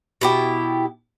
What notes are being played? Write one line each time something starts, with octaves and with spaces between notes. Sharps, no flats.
B2 E4 G4